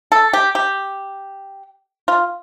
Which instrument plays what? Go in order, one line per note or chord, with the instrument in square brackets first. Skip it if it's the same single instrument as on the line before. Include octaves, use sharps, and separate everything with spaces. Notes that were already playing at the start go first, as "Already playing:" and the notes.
[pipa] A4
G4
G4
F4